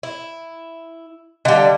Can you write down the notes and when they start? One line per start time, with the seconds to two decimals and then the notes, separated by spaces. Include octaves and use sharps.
0.03 E4
1.45 D3 G3 D#5 F5